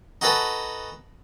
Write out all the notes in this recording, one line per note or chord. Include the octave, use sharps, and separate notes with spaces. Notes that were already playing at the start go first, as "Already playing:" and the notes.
D#4 F#4 G#4 A4 B4